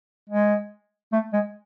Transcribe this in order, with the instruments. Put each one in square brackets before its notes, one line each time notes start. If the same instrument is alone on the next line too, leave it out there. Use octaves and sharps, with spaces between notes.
[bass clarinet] G#3
A3
G#3